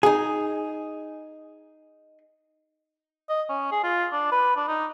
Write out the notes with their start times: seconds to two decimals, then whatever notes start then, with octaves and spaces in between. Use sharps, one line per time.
0.03 D#4 G#4
3.29 D#5
3.49 C#4
3.72 G#4
3.83 F4
4.12 D4
4.32 B4
4.56 D4
4.68 D#4